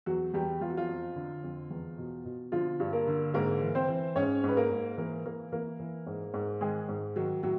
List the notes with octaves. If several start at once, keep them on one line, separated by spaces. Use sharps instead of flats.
E2 F#3 F#4
E2 G3 G4
E2 F4
F#4
F3 F4
F2
D3
F2
E2
B2
B2
D3 F3 F4
G2
A#3 A#4
D3
G#2 A#3 A#4
E3
C4 C5
E3
G#2 C#4 C#5
G#2
B4
A#3 A#4
G#2
E3 A#3 A#4
E3 A#3 A#4
E3 A#3 A#4
E3
G#2
G#2
D#3 G#3 G#4
G#2
D#3 F#3 F#4
A2 F#3 F#4